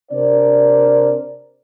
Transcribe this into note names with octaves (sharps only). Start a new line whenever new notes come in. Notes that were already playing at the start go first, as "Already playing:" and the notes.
C3 D4 A#4 C5 D5